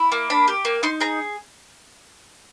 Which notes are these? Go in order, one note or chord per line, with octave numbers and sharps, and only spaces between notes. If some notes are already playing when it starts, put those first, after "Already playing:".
Already playing: E4
A#3
D4 B5
G4
A#3
D#4 C6
G#4 A#5